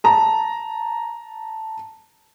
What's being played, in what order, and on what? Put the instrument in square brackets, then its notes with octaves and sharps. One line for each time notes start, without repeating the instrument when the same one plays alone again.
[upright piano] A5 A#5